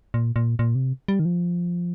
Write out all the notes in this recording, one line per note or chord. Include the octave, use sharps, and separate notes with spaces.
A#2
A#2
A#2
C3
G3
D#3
F3